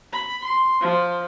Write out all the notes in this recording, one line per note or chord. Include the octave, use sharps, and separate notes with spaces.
B5
C6
F3